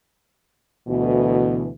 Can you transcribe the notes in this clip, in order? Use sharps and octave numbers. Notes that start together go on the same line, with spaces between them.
D2 B2 E3